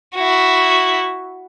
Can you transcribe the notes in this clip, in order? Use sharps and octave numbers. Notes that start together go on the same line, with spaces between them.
E4 F#4